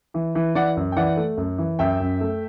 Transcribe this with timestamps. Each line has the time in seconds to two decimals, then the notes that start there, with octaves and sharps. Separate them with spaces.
0.14 E3
0.35 E3
0.55 E3 D5 F#5
0.77 F#2
0.92 G5
0.96 E3 D5 F#5
1.17 A3
1.37 F#2
1.58 E3
1.79 F#2 E5 G5
2.00 F#2
2.21 A3